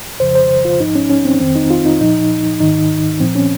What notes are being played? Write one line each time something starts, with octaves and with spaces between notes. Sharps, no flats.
F2 C#3 F3 C5
C5
F4
G#2 F3 D#4
C#4
C#4
C4
F2 D#3 C4
D#4
F4
D#4
A#2 F3 D#4
G#2 D#3 D#4
A#2 F3 C4
C#4